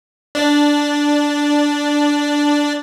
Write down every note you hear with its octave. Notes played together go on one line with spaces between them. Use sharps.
D4 D5